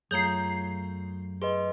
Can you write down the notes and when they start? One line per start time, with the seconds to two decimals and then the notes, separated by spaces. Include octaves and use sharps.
0.11 F#2 A3 F4 G#4 C#5 A#5 G6 C7
1.42 G#4 B4 D#5 C6